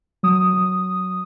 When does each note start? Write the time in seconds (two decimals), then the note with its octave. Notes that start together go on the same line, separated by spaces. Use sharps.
0.23 F#3 D#6
0.53 F#3